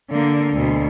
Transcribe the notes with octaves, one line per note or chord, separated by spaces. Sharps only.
D3 A#3
D2 B2